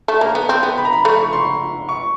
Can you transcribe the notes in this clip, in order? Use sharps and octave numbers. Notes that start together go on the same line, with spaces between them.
A3
A#3 A#5
B3
C4
B3
B5
A#5
B5
A3
C#6
C6
C#6